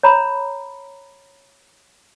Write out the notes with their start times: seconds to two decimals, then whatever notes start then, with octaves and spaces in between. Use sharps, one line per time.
0.03 C#5 A#5 B5